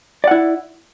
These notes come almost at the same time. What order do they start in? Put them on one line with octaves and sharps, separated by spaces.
D5 F#5 E4